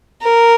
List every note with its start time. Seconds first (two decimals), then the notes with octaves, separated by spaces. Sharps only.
0.22 A#4